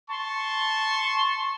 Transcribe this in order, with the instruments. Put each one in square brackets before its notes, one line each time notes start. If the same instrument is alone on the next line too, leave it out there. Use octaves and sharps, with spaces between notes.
[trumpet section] A5 C6 C#6